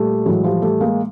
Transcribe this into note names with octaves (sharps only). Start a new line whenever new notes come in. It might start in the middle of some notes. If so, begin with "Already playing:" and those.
Already playing: A#2 G3 A3
A2 E3 F#3 G#3
F3 G3
G3 A3
G#3 A#3